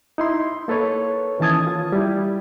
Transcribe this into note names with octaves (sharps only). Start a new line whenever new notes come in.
D#4 E4 C6
A#3 A4 B4 C#5
D#3 E3 C#4 A5 D#6 G#6
F4
G3 E4